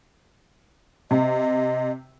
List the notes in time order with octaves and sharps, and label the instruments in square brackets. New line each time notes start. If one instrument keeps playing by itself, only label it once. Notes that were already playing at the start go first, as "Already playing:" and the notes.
[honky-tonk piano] C3 [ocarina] D#5